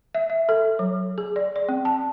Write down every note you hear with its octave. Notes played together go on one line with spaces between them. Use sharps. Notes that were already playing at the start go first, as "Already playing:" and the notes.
E5
E5
A4
F#3
G#4
D5
D5
C4
A5